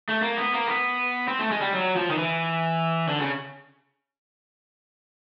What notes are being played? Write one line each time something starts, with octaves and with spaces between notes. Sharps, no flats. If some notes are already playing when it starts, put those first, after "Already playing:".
A3
A#3
B3
A#3
B3
C4
A3
G#3
G3
F#3
F3
D#3
E3
D3
C#3